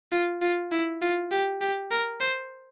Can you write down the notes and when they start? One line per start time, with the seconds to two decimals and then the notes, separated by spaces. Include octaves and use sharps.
0.12 F4
0.42 F4
0.72 E4
1.02 F4
1.32 G4
1.61 G4
1.91 A#4
2.20 C5